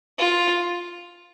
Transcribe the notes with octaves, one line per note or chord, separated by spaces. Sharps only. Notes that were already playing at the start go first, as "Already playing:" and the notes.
F4